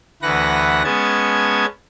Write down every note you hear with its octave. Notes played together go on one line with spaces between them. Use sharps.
D2 E3 B4 F#5 A#6
G#3 B3 C#4 A5 G#6